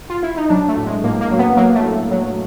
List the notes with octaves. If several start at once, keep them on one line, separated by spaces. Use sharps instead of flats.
F4
E4
D#4
F#3 D4
A3
A2
G#3
A2 A#3
A#3
F#3
B3
F#3 A#3
A3
A2
F#3